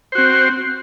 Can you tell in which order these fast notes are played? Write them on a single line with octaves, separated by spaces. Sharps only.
C5 F#4 C4